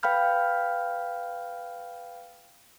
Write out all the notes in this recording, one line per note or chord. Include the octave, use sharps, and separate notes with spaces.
B4 F5 G5 B5 F6 G6